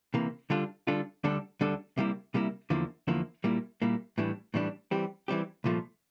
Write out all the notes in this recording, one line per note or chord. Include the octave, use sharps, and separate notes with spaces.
C3 E3 A#3
D3 G3 D4 F4 A4
D3 G3 D4 F4 A4
D2 D3 G3 D4 A4
D2 D3 G3 D4 A4
C3 G3 A#3 E4
C3 G3 A#3 E4
E2 D3 F3 A#3 E4
E2 D3 F3 A#3 E4
A#2 G3 A#3 E4
A#2 G3 A#3 E4
A2 E3 G3 D4
A2 E3 G3 D4
E3 G3 C4 G4
E3 G3 C4 G4
C2 A#2 F3 A3